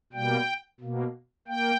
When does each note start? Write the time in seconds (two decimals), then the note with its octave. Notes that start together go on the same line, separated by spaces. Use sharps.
0.13 B2 G3 A#3 G5
0.80 B2 A#3
1.48 A#3 G5